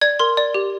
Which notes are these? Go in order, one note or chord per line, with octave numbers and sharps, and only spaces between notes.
D5 G#6
A#4 C6
D5
G4